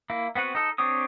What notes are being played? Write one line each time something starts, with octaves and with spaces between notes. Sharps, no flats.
A#3 E4
B3 C4 F#4 B4
D#4 A4
C4 D4 G4 C#5 D#6